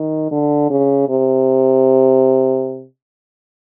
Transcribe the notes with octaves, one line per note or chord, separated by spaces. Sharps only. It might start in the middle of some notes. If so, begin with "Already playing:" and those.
Already playing: D#3
D3
C#3
C3